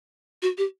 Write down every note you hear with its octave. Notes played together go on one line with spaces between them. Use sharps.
F#4
G4